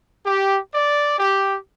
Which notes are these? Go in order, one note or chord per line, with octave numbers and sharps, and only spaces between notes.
G4
D5
G4